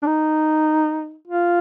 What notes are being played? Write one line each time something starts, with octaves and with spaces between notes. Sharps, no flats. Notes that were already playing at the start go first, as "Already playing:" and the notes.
D4
D#4
F4